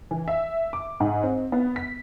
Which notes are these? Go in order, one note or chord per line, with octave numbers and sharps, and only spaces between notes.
E3
E5
D6
G#2
C4
B3
B6